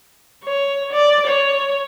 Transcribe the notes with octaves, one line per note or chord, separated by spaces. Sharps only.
C#5
D5
C#5